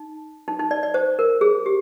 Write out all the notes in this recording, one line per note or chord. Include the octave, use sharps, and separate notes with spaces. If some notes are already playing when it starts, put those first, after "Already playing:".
Already playing: D#4
D#4
D#4
D5
D5
C5
A#4
G#4
G4